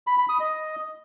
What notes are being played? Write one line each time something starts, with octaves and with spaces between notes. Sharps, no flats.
B5
B5
D#6
D#5